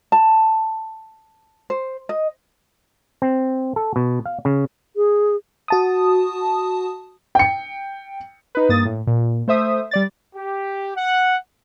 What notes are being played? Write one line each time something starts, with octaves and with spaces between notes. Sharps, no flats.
A5
C5
D#5
C4
A4
B2
F5
C#3
G#4
F#4 A5 D#6
G5 C#7
D#4 B4
G2 A#3 D#6 A6
A2
A#2
A3 C5 E5 D#6
G3 D5 A6
G4
F#5